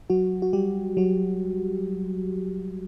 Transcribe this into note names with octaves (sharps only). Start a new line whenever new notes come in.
F#3 F#4
F#4
G3 G4
F#3 F#4